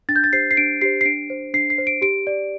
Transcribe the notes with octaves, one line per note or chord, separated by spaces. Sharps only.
D4 A6
G6
A6
G4 C5 C7
C7
D4 D7
G4 C5 C7
C7
D4 D7
C5
D4 C7
C7
C5
D7
G4 D7
D5